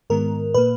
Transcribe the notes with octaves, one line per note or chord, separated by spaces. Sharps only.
G#2 D#3 G#3 B3 A#4
A#2 A#3 B4